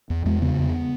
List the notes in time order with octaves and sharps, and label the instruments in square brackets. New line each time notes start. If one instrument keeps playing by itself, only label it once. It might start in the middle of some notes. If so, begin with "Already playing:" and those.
[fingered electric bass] E2
E2 G#3
C#3 B3
E2